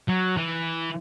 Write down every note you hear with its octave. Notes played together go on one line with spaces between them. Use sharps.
F#3
E3